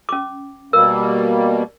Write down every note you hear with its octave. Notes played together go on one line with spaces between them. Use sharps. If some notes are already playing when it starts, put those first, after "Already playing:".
C#4 D6
B2 G3 A#3 A#4 E6